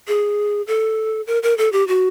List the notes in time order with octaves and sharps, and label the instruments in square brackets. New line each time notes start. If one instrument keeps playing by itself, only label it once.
[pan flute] G#4
A4
A#4
A#4
A4
G4
F#4